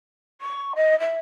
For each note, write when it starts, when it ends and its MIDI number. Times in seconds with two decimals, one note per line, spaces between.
0.41 0.73 85
0.75 0.98 75
0.99 1.18 76